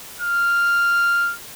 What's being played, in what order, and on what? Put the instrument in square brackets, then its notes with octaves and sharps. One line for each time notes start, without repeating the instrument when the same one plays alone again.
[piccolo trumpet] F6